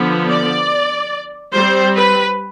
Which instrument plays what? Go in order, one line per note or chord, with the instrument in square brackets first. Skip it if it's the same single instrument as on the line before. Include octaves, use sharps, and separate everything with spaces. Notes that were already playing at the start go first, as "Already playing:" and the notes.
Already playing: [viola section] D3 F3 B3
D5
G3 C5
C4
B4